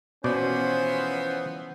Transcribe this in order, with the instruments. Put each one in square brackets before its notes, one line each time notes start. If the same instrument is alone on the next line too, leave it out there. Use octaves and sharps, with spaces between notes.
[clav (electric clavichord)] B2 D5 [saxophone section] E3 F3 B3 [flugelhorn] C#4 [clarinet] C5